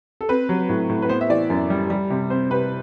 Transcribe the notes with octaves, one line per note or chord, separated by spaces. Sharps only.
A4
C4 B4
F#3
A2
A2
B4
B3 C5
E5
E3 D5
F#2
G3
G3
C3
C4 C5
C3 B4